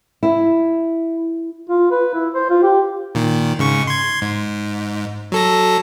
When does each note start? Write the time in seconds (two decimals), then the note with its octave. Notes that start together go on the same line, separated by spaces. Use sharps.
0.23 E4
1.70 F4
1.91 B4
2.14 E4
2.34 C5
2.50 F4
2.63 G4
3.15 A#2 D#3
3.59 G#2 C#3 C#6
3.87 C6 G#6
4.22 G#2
5.32 F#3 A4 A#6